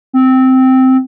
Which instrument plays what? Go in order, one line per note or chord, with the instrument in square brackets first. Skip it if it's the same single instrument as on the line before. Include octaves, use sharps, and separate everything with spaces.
[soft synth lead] C4